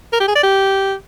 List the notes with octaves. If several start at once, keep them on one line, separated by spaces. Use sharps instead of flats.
A#4
G4
G#4
D5
G4